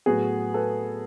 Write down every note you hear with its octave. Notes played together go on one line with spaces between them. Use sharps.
A2 F#3 B3 F#4 G#4
A4 B4